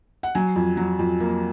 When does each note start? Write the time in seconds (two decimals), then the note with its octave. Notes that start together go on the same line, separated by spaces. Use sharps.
0.23 F#5
0.35 F#3 G#5
0.56 F2
0.77 F#3
0.99 F2
1.20 A#3